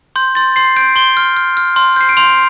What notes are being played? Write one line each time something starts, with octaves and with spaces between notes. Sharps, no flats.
C6 G6
C6 A6
C6 C7
G6 D7
C6 G7
F6
F6
F6
C6
G6 C7
D7
C6 F7